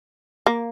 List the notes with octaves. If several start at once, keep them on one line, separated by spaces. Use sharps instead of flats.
A#3